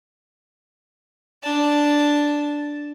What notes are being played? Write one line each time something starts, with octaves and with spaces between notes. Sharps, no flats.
D4 A5